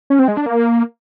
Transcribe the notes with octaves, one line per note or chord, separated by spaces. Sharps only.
C#4
C4
G#3
D4
A#3